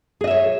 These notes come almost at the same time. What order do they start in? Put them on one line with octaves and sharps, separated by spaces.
G#4 D#5 E5 C#5